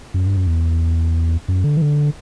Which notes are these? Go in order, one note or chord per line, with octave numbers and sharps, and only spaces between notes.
F#2
G2
F#2
E2
F#2
D3
E3
D3